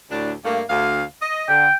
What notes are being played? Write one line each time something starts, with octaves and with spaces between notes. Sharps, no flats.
D2 A2 D4
G2 A3 A#3
D2 F5
D#5
D3 G5